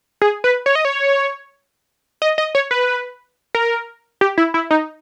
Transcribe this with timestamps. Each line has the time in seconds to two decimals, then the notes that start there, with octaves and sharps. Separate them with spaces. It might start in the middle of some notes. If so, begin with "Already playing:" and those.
0.22 G#4
0.44 B4
0.66 C#5
0.75 D#5
0.85 C#5
2.22 D#5
2.38 D#5
2.55 C#5
2.71 B4
3.55 A#4
4.21 G4
4.38 E4
4.54 E4
4.71 D#4